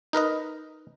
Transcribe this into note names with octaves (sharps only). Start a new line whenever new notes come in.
D#4 A#4 B4 D#5